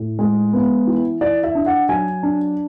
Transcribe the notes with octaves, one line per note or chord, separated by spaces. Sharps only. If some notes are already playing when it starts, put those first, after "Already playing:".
Already playing: A2
G#3
B3
E3
E3 D5
E5
D4
F#5
F#3 G#5
D4